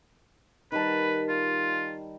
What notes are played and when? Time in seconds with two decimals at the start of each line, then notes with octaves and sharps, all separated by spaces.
0.72 D#3 G3 B4 A5
1.29 F4